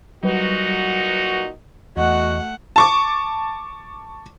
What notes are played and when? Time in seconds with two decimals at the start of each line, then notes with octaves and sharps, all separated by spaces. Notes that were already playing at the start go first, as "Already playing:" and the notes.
0.23 A#2 F#3 G3 D#4 F#4 B4
1.97 E2 A3 F#4 D#5 F#5
2.76 A5 C#6 D6